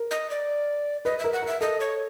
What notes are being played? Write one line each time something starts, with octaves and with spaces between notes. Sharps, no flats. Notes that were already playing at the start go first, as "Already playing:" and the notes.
Already playing: A#4
D#5
D5
B4 D#5
E5
A#4
F#5
A#4 E5
A4 D#5
C#5